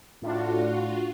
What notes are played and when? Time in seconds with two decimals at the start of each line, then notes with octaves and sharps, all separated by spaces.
0.22 A2 D4 F4 F#4